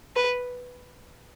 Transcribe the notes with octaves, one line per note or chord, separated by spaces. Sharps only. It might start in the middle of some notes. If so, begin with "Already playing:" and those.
B4